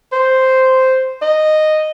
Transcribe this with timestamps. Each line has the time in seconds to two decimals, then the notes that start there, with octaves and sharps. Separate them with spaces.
0.12 C5
1.22 D#5